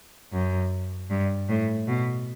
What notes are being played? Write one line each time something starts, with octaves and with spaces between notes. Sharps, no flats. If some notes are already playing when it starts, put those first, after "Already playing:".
F#2
G2
A2
B2